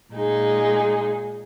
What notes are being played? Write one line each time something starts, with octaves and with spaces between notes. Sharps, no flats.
A#2 G#3 D#4 G#4